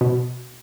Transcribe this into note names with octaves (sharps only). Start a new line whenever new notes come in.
B2